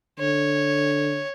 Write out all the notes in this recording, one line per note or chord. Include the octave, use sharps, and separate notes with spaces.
D3 C#5